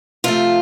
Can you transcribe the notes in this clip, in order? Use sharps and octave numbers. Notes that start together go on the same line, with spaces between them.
C3 F3 A3 F4